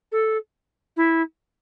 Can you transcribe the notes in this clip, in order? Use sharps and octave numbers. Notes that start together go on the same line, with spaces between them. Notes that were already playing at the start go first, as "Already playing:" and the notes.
A4
E4